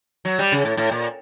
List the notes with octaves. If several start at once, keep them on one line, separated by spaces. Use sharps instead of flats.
F#3
G3
C#3
A2
A2
A#2